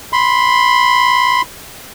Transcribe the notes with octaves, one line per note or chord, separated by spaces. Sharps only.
B5 C6